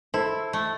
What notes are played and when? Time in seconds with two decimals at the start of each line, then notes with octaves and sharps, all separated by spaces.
0.14 E4 A4 C5
0.53 A3